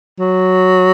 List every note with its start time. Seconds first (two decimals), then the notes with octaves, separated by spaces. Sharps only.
0.19 F#3